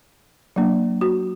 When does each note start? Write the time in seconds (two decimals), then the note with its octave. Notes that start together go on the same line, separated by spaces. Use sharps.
0.56 F#3 A#3 D4
1.01 F#4